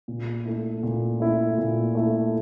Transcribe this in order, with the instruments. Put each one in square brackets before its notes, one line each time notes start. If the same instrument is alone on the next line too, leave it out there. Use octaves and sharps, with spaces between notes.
[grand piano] A#2
A3 E4
A#2
A3 E4
A#2
A3 E4